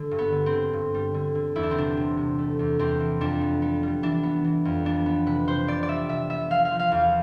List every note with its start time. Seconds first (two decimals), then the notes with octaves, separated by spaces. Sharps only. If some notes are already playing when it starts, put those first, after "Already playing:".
Already playing: D3
0.11 G2
0.18 B3
0.32 D3
0.46 C4
0.53 D3
0.73 G2
0.94 G3
1.14 D3
1.35 D3
1.55 E2 E4
1.63 D4
1.71 C4
1.77 C3 D4
1.97 C3
2.17 C3
2.39 A3
2.59 E2
2.79 E2 C4
3.00 E3
3.21 F2 D4
3.41 B3
3.62 B3
3.83 G3
4.03 E3 D4
4.23 B3
4.44 E3
4.65 F2
4.85 B3 D4
5.06 B3
5.26 C3 B4
5.47 C3 C5
5.68 B3 D5
5.83 D5
5.88 G3 E5
6.09 C3 E5
6.29 B3 E5
6.50 F3 F5
6.65 F5
6.71 F3
6.79 F5
6.92 E2 F5